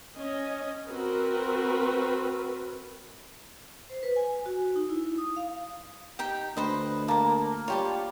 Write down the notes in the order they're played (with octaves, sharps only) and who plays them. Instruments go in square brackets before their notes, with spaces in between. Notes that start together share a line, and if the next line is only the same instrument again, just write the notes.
[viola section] C#4 D#5
C4 F#4 A#4 B4
[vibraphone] C5
B4
G#5
F#4
D#4
E4
D#6
F5
[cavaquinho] D#4 G4 G5
[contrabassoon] D2 [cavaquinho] B4 C5 D#5
[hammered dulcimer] A#3 [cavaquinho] A5 A#5
[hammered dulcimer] G3 F4 [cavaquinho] C#5 G5 A5